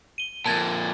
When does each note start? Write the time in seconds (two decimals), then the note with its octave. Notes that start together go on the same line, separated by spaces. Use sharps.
0.18 D#7 G7
0.46 F2 A#2 A5 G#6 A6